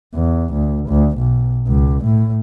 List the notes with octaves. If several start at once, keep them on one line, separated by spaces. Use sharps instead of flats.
E2
D2
D2
B1
C#2
A2